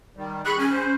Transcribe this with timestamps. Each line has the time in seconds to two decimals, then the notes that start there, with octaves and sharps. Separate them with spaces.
0.17 D#3 G3
0.45 G#4 B5 C#6 F#6
0.59 C#4 G#5
0.71 C5